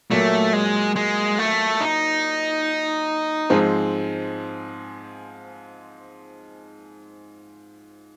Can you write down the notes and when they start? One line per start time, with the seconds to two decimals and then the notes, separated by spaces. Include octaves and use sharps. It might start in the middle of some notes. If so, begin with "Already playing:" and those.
0.11 A#2 F#3 A3 A#3
0.53 G#3
0.96 G#3
1.39 A3
1.80 D#4
3.50 G#2 F3 G#3 C4